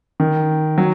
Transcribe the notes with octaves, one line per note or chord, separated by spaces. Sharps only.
D#3
F#3